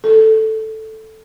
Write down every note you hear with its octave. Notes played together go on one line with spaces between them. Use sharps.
A4